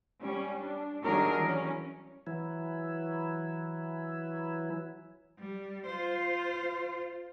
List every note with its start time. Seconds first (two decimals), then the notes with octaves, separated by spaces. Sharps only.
0.23 G3 C#4
0.62 D4
1.03 D#3 F#3 G3 D4 G#4 A#4
1.41 E3 C#4
2.27 E3 F#3 E4
5.39 G3
5.86 F4 C5